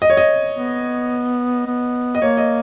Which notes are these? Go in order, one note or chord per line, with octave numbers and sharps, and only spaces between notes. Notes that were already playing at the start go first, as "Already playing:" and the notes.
D#5
C#5
D#5
B3
B3
D#5
A#3 C#5
D#5